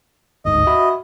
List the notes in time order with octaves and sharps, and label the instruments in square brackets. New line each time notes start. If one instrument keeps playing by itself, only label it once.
[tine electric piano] G1 D2 G#2 [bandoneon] D#5
[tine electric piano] F#4 E5 B5